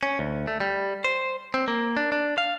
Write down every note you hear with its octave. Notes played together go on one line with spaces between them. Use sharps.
C#4
D2
A3
G3
C5
C4
A#3
D4
D4
F5